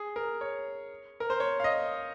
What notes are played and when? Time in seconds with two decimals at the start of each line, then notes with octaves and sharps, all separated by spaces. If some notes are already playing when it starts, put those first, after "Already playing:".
Already playing: G#4
0.16 A#4
0.41 C#5
1.20 A#4
1.30 C5
1.40 C#5
1.60 F5
1.64 D#5